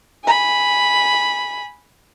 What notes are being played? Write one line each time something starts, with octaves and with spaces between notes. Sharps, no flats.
G#5 B5